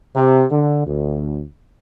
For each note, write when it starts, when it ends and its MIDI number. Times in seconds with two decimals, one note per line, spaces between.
0.16 0.44 48
0.51 0.86 50
0.87 1.43 38